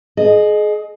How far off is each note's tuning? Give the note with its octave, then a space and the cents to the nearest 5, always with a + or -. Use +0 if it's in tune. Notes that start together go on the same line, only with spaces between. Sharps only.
G#4 +30 D#5 -15